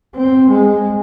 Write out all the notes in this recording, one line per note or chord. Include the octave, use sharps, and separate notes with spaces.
C4
G#3